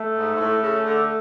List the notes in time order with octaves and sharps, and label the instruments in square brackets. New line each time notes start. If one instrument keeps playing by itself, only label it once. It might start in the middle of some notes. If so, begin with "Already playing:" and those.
Already playing: [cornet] A3
[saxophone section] G#2
G#2
A2
C#3
D3